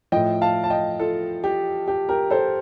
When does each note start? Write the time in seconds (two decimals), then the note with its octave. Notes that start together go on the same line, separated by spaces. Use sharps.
0.12 A2 F3 D#5 G5
0.41 F5 A5
0.64 A5
0.70 D#5 G5
1.00 F4 A4
1.44 G4
1.88 G4
2.09 G4 A#4
2.30 A4 C5